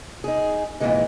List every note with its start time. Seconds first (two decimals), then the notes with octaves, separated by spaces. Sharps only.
0.24 D#4 G#4
0.80 F2 A#2 D3 E3 G#3 D#4